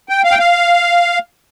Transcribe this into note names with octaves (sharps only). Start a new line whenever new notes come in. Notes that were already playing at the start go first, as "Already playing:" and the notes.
G5
F5
G5
F5